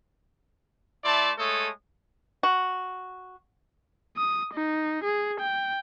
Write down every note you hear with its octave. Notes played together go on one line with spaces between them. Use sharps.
A3 E4 D5 A5 C6
G#3 A3 A4 C#5 D#6
F#4
D#6
D#4
G#4
G5